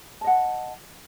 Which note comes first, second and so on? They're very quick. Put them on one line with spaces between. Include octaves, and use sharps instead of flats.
A5 D#5 F#5